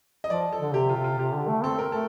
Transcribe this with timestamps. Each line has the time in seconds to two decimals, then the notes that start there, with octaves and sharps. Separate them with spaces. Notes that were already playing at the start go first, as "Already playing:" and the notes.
0.24 D#5
0.30 F3 D5
0.52 A4
0.60 D3
0.74 C3 G4
0.89 F4
0.96 C3
1.04 F4
1.18 C3 G4
1.34 D3
1.48 A3
1.63 C4 A4
1.79 A#4
1.92 A3 A4